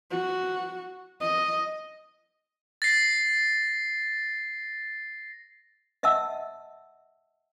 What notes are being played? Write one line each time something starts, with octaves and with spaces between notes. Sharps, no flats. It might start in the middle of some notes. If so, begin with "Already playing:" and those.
F#4
D#5
A6 A#6 C7
D#5 E5 F#5 A5 E6